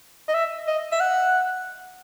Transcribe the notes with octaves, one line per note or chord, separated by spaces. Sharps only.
D#5
E5
D#5
E5
F#5